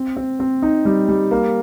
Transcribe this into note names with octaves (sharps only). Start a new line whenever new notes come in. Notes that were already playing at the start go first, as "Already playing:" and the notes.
Already playing: C4
C4
C4
D#4
G3
G3
A#3